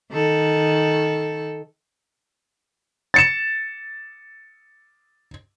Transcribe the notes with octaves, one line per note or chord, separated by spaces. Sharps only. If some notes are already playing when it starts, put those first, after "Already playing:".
D#3 A4
A6 C#7 E7